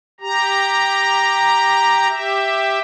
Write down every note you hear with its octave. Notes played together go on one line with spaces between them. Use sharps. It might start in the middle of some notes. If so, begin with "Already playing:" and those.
G4 A#5
G4 E5